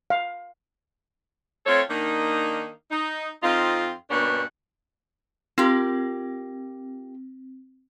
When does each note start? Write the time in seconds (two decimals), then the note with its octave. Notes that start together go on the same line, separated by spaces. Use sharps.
0.10 F5
1.66 A3 C4 F4 A4 C#5
1.89 D#3 A#3 D4 D#4
2.91 D#4
3.43 F2 C4 D#4 F4
4.10 G2 B2 A#3 C#4 D4 F#5
5.58 C4 F4 G4 A#4